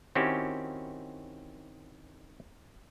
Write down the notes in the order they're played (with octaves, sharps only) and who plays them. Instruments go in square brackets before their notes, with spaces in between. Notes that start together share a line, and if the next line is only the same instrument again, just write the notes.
[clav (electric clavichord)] D#3 C4 C#4 E4 F#4 G4